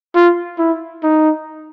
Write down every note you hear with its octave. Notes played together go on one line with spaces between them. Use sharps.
F4
E4
D#4